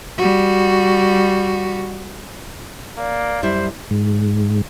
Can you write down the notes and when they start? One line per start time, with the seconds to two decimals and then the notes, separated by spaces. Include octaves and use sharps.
0.18 G3 F#4
2.98 A#3 D5
3.43 F#2 G3 E4 C5
3.91 G#2